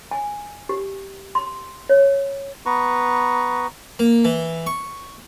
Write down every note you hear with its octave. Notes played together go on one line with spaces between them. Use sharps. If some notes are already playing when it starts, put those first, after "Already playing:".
G#5
G4
C6
C#5
B3 B4 A#5 C#6
A#3
E3
C#6